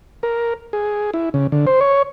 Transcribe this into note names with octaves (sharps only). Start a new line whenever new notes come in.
A#4
G#4
E4
C#3
D3
C5
C#5